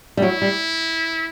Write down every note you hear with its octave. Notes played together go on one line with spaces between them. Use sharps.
G3
F#3 E4
G3